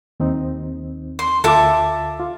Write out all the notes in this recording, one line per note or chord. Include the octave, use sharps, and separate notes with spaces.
D#2 C4 D#4
C6
D2 F4 A4 E5 D6
F4